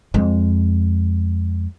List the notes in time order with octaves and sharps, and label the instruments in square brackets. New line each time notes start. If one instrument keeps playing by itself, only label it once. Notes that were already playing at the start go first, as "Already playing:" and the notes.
[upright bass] F2 G#3